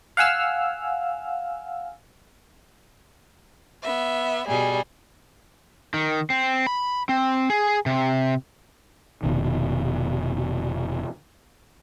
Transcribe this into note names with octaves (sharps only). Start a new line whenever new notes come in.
F5 F#5 G#5 E6 F6
B3 E5
B2 G3 G#4
D#3
C4
B5
C4
G#4
C3
F1 C2 B2 D#3